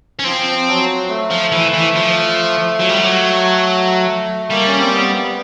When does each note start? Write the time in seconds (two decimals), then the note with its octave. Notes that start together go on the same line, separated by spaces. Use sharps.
0.19 C#4
0.25 F3 C4
0.68 F#3
1.09 A3
1.31 F3
1.52 E3
1.73 E3
1.95 F3
2.80 F#3
2.90 G3
2.99 F#3
4.50 G3 A#3
4.67 C#4
4.80 C4
4.93 B3